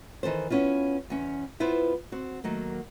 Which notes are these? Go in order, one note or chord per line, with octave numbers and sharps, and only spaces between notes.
D#3 E3 A4 C5
B3 C#4 E4 F4
E2 C#4
B3 E4 F4 B4 C5
C4 F#4
D#3 F#3 A3 A#3